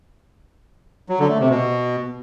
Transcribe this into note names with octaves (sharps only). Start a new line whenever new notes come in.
F#3
D3
A3
C3
B2